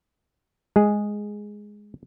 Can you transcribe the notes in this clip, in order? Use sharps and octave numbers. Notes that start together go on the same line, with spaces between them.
G#3 G#4